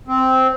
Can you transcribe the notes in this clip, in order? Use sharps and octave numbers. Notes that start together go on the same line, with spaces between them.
C4